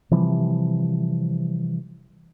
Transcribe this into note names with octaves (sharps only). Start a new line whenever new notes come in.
C3 E3 F3 G3